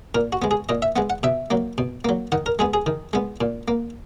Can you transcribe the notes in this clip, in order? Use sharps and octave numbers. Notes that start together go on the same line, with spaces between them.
A#2 A#4
F#4
G#3 B3
G#4
A#2 D#5
E5
G#3 B3 F#5
F#5
B2 E5
F#3 A#3
B2
F#3 A#3
D#3 F#5
A#4
G#3 B3 G#4
G#4
D#3
G#3 B3
A#2
A#3